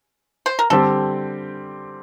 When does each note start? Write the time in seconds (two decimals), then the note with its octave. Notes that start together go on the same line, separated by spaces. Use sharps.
0.46 C5
0.59 A#4
0.70 D3 G3 C4 G4 A4